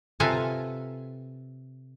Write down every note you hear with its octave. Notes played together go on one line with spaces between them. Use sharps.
C3 F4 A4 B4 G#5 A#5